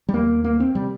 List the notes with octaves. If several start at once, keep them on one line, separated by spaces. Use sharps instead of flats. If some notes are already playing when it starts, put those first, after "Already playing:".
G3
D#2 A#3
A#3
C4
C3 G3